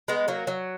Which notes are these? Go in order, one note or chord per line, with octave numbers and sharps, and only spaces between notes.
G#3 B3
F#3 A#3
F#3